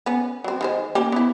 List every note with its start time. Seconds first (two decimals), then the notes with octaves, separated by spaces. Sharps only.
0.06 B3 C#4
0.44 F#3 C4
0.61 D#3 G#3 C5
0.95 A#3 C#4 G4
1.12 B3 E4